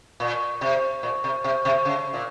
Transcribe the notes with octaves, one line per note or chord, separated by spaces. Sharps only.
A#2
C3
A#2
C3
C3
C3
C#3
A#2